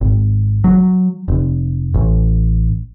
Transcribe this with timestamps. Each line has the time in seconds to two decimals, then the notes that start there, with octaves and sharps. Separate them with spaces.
0.01 G#1
0.64 F#3
1.28 F1
1.94 A1